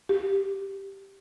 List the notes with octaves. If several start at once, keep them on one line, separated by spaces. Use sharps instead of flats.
G4